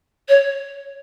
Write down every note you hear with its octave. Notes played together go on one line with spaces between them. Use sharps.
C#5